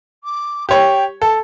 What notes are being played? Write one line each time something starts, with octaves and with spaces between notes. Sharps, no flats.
D6
G4 C#5 G5
A4 A5